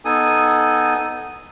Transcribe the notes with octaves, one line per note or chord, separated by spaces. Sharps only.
B3 D#4 A4 G#5 D#6